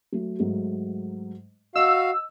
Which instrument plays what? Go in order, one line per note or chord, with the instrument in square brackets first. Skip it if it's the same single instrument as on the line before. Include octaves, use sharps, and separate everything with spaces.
[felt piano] F#3 A3
G#2 F#3 A3
[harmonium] F#4 F5 [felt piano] D#5 [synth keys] E6